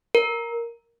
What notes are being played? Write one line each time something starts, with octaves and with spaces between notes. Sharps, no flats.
A#4